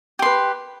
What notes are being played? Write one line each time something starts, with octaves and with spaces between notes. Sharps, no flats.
G4 B4 C6